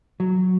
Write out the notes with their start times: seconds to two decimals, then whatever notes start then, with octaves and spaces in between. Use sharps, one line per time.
0.20 F#3